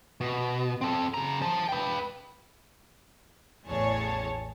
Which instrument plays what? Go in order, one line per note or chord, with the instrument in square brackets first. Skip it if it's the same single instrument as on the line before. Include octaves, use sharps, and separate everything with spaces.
[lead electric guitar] B2
C4 A4
C#3 A#5
C5 A5
B4 G5
[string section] A1 E2 G#4 C#5 A5